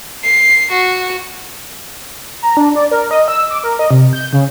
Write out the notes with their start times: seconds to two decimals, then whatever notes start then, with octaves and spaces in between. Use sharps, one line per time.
0.24 C7
0.72 F#4
2.42 A#5
2.57 D4
2.75 D5
2.91 A#4
3.11 D#5
3.28 E6
3.51 D6
3.64 A#4
3.79 D#5
3.91 C3
4.13 G6
4.33 C#3